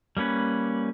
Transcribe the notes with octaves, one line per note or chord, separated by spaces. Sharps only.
G3 A#3 C#4 B4